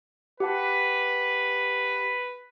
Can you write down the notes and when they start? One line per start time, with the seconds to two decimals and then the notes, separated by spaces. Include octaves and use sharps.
0.40 G4 B4 F#5 A5